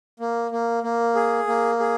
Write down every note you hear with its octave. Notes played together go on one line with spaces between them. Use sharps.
A#3
A#3
A#3
G#4
A#3
G#4